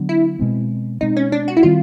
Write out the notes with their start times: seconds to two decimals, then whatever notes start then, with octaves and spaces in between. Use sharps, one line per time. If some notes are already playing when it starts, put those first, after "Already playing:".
Already playing: D3 F#3 B3 D4
0.09 E4
0.39 B2 G#3 C4
1.01 B2 G#3 C4 D#4
1.17 C#4
1.32 D4
1.48 F#4
1.57 E4
1.63 D#3 G3 C4 F4